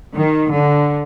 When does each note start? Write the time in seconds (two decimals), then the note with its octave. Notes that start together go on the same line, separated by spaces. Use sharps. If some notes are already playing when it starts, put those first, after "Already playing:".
0.16 D#3
0.53 D3